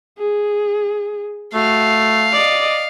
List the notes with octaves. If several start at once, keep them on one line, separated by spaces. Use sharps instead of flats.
G#4
A3 F#4 F5
D5 D#5